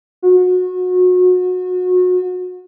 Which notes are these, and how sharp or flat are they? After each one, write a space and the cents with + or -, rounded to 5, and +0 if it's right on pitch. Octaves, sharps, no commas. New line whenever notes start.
F#4 -30